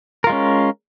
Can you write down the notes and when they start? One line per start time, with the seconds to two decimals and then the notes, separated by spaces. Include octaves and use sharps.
0.24 A#4
0.27 F4
0.30 G#3
0.32 C#4